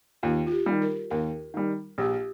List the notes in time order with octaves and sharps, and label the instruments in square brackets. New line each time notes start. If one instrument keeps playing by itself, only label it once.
[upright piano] D#2 [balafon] F4
[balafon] F4
G4
[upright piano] D#3 G3
[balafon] A#4
[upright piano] D#2 [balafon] A#4
[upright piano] D#3 G3
[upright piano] A#1 [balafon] G4